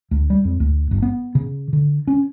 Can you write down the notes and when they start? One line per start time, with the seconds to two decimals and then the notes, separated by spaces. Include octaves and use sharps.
0.11 D2
0.30 G3
0.45 F2
0.60 D2
0.91 G1
1.02 B3
1.35 C#3
1.73 D3
2.07 C#4